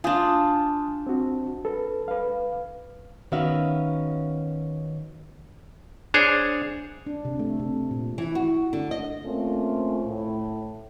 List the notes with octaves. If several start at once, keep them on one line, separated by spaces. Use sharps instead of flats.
D4 F4 G#5 D#6 G6
C4 F#4
A4 B4
B4 F5
D#3 B3 C#4 F#4 E5 F5
D4 G#4 C5 C#5
D4
C3
A3
C3
A#2
E3
F#4
D3
D#5
A3 A#3 C4 C#4 F4
A2